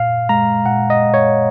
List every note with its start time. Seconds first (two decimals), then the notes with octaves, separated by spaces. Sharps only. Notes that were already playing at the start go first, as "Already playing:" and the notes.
Already playing: A#2 F5
0.29 G#3 A#5
0.66 A#2 F#5
0.90 D#5
1.02 G#3
1.14 C#5